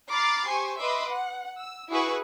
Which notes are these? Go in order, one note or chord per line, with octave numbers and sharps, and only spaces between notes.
A#5 B5 D6 F6 A6 C7
G4 C5 G#5 C6 C#6
B4 D#5 E5 B5 C6 D6
F#5
E6
E4 F#4 G#4 B4 F#5 C#6